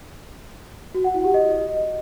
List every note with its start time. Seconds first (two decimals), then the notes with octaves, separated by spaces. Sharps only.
0.94 F#4
1.04 F#5
1.14 E4
1.24 G4
1.34 D#5